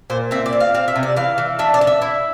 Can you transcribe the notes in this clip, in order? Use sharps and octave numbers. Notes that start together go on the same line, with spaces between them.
A#2 C5
C4 E5
D5
C4
F5
C4 F5
E5
C3
D5
E3 F5
E3
D4 E5
D5
D4
E5
E4